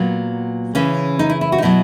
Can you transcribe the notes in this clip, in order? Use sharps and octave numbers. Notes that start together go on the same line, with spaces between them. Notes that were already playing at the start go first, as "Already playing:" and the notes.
Already playing: A#2 F#3 B3
C#3 E3 C#4
D#4
E4
E4
F#4
D#4
B2 F#3 E4